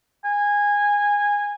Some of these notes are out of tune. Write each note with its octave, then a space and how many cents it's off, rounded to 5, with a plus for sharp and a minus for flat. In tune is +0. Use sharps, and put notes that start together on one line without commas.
G#5 -15